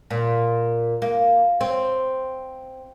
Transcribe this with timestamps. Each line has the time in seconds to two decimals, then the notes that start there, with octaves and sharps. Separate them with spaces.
0.10 A#2
1.02 A#3
1.61 C4